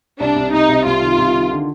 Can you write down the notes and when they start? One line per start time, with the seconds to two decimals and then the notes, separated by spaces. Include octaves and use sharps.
0.19 C2 D4
0.36 C2
0.53 C2 D#4
0.69 C3
0.85 C2 F4
1.02 D#3
1.18 C2
1.35 D#3
1.51 D3